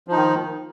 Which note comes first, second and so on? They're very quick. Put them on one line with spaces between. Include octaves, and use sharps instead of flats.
F3 D#4 D#3